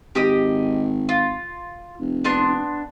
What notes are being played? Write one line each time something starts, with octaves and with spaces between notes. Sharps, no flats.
G#1 G4 D#5 D#6
F4
F1
B3 D4 C6